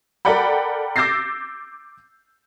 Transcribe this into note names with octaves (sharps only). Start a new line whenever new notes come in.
A4 A#4 D5 F#5 G5 B5
D6 E6 G6 A6 A#6 C7